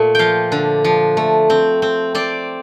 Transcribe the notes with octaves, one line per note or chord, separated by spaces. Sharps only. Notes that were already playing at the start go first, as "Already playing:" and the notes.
Already playing: A#2 A3 E5
F3 F5 G5
D3
F3
A3
C4
C4
C4 D5